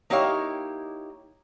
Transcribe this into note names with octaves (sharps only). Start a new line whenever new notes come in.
A#3 D#4 E4 G4 C#5 F5